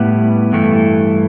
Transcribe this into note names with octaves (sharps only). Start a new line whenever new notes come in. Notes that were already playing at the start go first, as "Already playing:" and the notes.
Already playing: A2 G3 B3 E4
G2 E3 A3